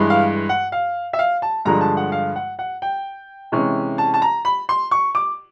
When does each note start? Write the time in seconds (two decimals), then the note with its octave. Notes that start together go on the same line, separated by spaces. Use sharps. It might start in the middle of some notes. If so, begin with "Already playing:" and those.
Already playing: G2 E3 G#3
0.10 F5
0.49 F#5
0.72 F5
1.13 E5
1.19 F5
1.42 A5
1.65 G2 D3 F3 G#3 A#5
1.81 A5
1.97 F#5
2.12 F5
2.36 F#5
2.59 F#5
2.82 G5
3.52 C3 E3 G#3 C#4
3.98 A5
4.14 A5
4.22 A#5
4.45 B5
4.69 C6
4.91 C#6
5.15 D6